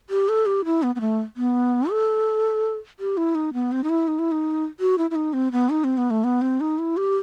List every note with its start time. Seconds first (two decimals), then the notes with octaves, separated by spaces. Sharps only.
0.10 G4
0.29 A4
0.46 G4
0.65 E4
0.83 B3
0.95 B3
1.01 A3
1.37 B3
1.91 A4
3.00 G4
3.17 E4
3.35 D#4
3.53 B3
3.72 C4
3.84 D#4
3.89 E4
4.08 D#4
4.19 E4
4.32 D#4
4.80 F#4
4.98 E4
5.11 E4
5.15 D#4
5.33 C4
5.52 B3
5.70 D#4
5.84 C4
5.98 B3
6.10 A3
6.24 B3
6.42 C4
6.60 D#4
6.79 E4
6.97 G4